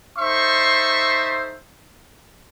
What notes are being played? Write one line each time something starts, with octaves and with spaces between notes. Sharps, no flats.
D#4 A4 C5 E5 C6 C#6